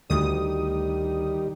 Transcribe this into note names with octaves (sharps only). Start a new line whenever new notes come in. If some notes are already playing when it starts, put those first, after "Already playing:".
D2 D#3 G3 D#6